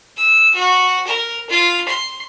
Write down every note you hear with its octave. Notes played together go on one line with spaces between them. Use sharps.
E6
F#4
A#4
F4
C6